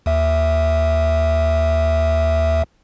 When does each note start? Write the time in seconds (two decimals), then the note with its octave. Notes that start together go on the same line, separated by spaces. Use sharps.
0.06 D#2 E5